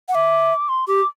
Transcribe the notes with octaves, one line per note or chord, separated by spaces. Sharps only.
F#5
E5 D6
C6
G4 D6